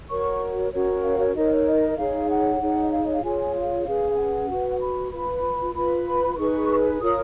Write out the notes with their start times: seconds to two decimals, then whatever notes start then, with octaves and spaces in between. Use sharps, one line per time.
0.09 F#4 A#4 C#5 C#6
0.72 C#4 F#4 A#4 C#5
1.04 F5
1.19 C#5
1.34 D#4 A#4 C#5 D#5
1.51 C#5
1.66 D#5
1.98 D#4 G#4 C#5 F5
2.29 F#5
2.60 D#4 G#4 C#5
2.82 D#5
2.92 F5
3.03 D#5
3.13 F5
3.23 F4 G#4 C#5 G#5
3.55 F5
3.86 C#4 G#4 B4
4.12 G#5
4.17 F#5
4.50 F#4 B4
4.80 B5
5.12 F4 B4 B5
5.75 F4 B4 B5
6.37 D#4 G#4 B4 C#6
7.01 F4 A#4 C#5 D#6